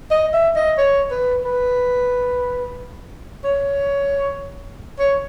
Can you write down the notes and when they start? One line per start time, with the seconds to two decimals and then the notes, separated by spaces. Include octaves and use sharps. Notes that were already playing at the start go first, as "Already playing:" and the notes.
0.11 D#5
0.33 E5
0.56 D#5
0.78 C#5
1.11 B4
1.45 B4
3.44 C#5
4.99 C#5